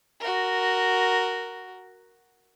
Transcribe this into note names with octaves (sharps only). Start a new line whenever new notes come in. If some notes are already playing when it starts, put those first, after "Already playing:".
F#4 A#4